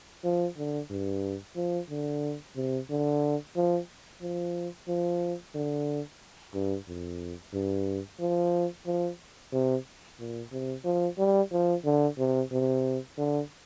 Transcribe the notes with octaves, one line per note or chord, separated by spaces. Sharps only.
F3
D3
G2
F3
D3
C3
D3
F3
F3
F3
D3
G2
F2
G2
F3
F3
C3
A#2
C3
F3
G3
F3
D3
C3
C3
D3